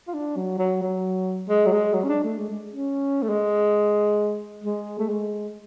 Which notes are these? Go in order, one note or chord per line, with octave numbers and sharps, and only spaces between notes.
F4
D4
F#3
F#3
F#3
G#3
F#3
G#3
F#3
C#4
D4
A3
G#3
G#3
C#4
A3
G#3
G#3
A3
G#3